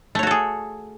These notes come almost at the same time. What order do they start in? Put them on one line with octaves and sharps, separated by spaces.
A3 C#5 F#4 A4 G#4